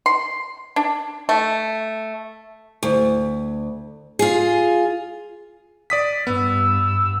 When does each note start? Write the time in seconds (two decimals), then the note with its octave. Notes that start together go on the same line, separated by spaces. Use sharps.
0.06 C6
0.76 D4
1.29 A3
2.83 D2
4.19 F4 G#4
5.90 D5 D#6 B6
6.27 G2 B3 E6